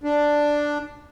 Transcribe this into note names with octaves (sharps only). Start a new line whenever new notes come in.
D4